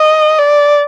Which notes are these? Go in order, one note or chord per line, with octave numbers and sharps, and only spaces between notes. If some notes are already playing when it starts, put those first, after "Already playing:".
Already playing: D#5
D5